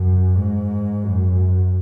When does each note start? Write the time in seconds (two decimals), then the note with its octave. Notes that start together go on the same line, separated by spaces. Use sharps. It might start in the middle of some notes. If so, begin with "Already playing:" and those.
Already playing: F#2
0.35 G#2
1.03 F#2